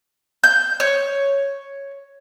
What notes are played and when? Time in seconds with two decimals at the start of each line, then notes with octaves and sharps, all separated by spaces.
0.44 G6
0.80 C#5